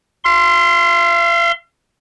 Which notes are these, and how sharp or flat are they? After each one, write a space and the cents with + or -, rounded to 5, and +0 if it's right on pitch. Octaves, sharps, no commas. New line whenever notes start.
F5 -45 C6 +0